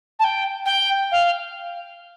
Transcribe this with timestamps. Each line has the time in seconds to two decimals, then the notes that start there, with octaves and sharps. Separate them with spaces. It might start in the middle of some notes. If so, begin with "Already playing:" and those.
0.19 A5
0.24 G5
0.66 G5
1.12 F5